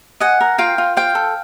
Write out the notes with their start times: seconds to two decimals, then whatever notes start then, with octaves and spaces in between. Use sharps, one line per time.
0.20 D#5 F#5 G#5
0.41 A#4
0.58 F4 F5 G5
0.78 F4
0.97 C5 F5 G5
1.15 A4